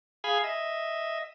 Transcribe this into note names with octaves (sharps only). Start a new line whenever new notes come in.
G#4 F5 G#5 B5
D#5 E5